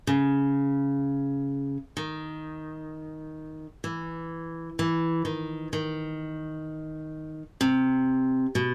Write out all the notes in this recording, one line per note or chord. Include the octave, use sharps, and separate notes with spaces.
C#3
D#3
E3
E3
D#3
D#3
C3
B2